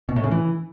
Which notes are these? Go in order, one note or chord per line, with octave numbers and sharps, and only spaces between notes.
B2
A2
C#3
E3